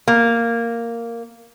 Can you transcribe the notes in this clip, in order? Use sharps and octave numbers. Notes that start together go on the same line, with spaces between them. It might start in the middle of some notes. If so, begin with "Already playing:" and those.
A#3